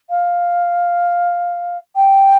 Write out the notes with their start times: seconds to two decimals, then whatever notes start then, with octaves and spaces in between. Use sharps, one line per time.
0.10 F5
1.96 G5